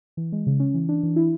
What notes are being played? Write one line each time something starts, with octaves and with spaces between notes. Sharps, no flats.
E3
G#3
C#3
C#4
E3
D4
E3
E4